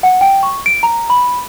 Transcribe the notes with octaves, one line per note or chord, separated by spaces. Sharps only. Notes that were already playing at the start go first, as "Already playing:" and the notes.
F#5
G5
C#6
D7
A#5
B5